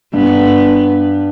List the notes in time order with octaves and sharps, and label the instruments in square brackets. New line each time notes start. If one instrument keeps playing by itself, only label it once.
[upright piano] G2 [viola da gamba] B3